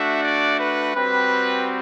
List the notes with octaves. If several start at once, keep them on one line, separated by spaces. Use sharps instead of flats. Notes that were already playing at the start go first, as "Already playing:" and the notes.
Already playing: A3 D4 F#4 E5
D5
B4
G3 C4 F#4 B4